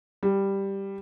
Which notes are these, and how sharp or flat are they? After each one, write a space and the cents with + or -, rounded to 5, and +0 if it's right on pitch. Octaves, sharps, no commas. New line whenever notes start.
G3 +5